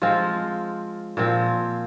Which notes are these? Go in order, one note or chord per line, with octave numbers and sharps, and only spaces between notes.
F3 G#3 C4 F4
A#2 F3 C4